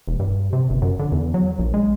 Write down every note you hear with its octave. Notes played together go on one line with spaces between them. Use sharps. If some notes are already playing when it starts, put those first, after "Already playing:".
E1
G2
C3
G1
F#2
D3
E2
F#3
A#1
G#3